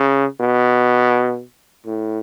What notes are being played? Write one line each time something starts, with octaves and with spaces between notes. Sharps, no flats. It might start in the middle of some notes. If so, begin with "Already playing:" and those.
Already playing: C#3
B2
A2